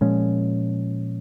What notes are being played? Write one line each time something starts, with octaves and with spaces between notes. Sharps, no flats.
A#2 F3 G#3 C#4